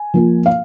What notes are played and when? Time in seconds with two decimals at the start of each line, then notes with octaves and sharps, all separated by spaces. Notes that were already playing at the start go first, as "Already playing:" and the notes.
Already playing: G#5
0.14 F3 A#3 F4
0.46 F5